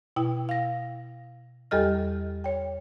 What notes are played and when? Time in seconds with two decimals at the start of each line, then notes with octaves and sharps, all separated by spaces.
0.16 B2 E4 G5
0.49 F5 A#6
1.71 E2 G3 G4 A4 D#5 F6
2.44 C#5 G5